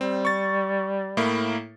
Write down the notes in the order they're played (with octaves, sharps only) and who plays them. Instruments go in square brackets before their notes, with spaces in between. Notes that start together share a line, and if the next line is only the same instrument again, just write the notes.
[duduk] G3 [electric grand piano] C4
[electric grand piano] C#6 A6
A2 A#3 E4